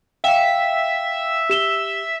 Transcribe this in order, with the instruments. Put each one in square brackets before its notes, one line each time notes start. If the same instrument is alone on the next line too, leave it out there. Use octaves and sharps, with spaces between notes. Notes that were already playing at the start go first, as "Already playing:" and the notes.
[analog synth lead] E5 [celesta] F5 G5 E7
[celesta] G4 E7 G7